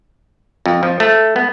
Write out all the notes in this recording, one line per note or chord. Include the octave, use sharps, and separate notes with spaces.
F2
F3
A3
B3